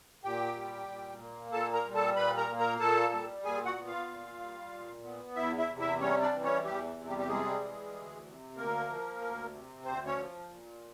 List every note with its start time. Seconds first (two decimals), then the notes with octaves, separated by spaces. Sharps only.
0.24 A#2 G4 G5
0.56 G3
0.88 A#2
1.20 A#3
1.52 A#2 A4 A5
1.73 A#4 A#5
1.84 G3
1.95 A4 A5
2.16 A#2 B4 B5
2.37 A#4 A#5
2.49 A#3
2.59 A#4 A#5
2.80 A#2 A4 A5
3.13 G3
3.44 A#2 G#4 G#5
3.65 F#4 F#5
3.76 B3
3.87 F4 F5
4.08 A#2
4.40 G3
4.73 A#2
5.04 B3
5.36 E2 E4 E5
5.58 E4 E5
5.69 C3
5.79 E4 E5
6.00 G3 C#4 C#5
6.22 D4 D5
6.32 E3
6.43 C#4 C#5
6.64 E2 G3 G4
6.97 C3
7.07 G3 G4
7.18 G4
7.28 G3 G#3 G#4
7.60 E3
7.93 D2
8.25 C3
8.56 D2 A#3 A#4
8.89 F3
9.21 D2
9.53 C3
9.84 D2 C4 C5
10.06 C#4 C#5
10.17 F3
10.49 A#2